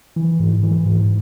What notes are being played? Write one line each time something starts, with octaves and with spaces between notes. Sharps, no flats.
E3
G#2
E3
G#2